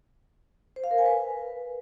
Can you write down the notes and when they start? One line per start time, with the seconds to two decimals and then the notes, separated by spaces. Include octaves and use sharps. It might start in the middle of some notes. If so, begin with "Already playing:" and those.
0.76 C5
0.84 F5
0.91 A#4
0.98 G#5
1.06 B4